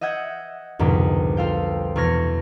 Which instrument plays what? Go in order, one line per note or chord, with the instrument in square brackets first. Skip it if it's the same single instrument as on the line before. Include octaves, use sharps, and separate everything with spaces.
[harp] D#5 E5 F#5 G6 G#6
C2 F2 G#2 B2 D3
F4 A4 F5 G5
E2 B2 C#6 F6 G#6 A#6